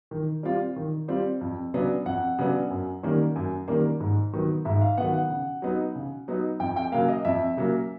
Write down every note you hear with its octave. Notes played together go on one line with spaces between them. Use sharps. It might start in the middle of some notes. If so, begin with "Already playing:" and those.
D#3
G3 C4 F4
D#3
G3 C4 F4
F2
C#3 F#3 B3 D4
F2 F#5
C#3 F#3 B3 D4
F#2
D#3 G3 A#3 C#4
F#2
D#3 G3 A#3 C#4
G#2
D#3 F#3 B3
G#2 E5
F5
D#3 F#3 B3 F#5
F#5
C#3
F#3 B3 D#4
C#3
F#3 B3 D#4
F2 G5
G5
C#3 F#3 A#3 F5
D#5
F2 E5
C#3 F#3 A#3